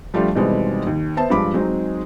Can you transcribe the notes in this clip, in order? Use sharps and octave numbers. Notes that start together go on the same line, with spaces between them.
F3 G3 A3 D4 F4 G4
B2 D#3 E3 G3 G#3 C4
D#2
B3 C5 E5 A5
G2 F3 G#3 B5 D6
F#3 G#3 C4 D#4